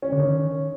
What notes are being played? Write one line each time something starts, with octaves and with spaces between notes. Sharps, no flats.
C#4
D3
D#3